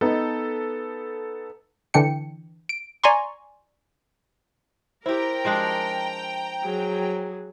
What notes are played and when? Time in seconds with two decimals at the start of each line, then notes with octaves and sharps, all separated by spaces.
0.01 B3 D#4 A4
1.94 D3 E3 D4 G5 C#7
2.69 D7
3.04 D5 G#5 A#5 C6 C#6
5.06 E4 G4 A#4 C5 G5 A#5
5.45 F3 G#3 D4
6.64 F#3 G#4